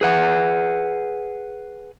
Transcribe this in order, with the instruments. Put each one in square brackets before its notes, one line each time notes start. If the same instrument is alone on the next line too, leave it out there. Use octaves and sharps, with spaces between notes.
[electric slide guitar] G#4 B4 F#5